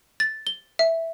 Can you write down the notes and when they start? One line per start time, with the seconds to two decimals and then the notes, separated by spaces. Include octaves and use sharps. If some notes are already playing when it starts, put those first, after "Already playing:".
0.20 A6
0.47 G7
0.79 E5